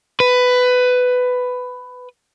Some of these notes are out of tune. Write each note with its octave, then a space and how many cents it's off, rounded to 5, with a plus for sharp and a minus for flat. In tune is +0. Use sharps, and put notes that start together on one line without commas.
B4 +15